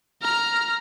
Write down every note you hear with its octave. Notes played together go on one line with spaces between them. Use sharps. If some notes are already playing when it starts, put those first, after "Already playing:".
A#5 F6